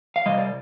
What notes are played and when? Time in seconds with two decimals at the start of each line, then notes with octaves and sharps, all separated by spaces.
0.16 F5
0.26 C3 G3 D#5
0.38 D5